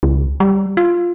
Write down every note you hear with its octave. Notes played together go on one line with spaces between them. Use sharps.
C#2
G3
F4